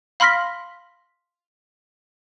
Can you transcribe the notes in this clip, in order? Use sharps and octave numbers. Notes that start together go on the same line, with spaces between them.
F5 B5 C6 F6 A#6 B6